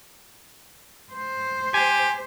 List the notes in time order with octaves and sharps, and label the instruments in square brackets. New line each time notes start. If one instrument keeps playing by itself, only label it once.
[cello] C5
[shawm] G4 [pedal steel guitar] G#5